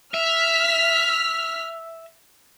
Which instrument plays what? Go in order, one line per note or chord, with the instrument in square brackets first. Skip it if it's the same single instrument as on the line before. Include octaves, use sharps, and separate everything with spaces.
[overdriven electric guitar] E5 [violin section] F6 B6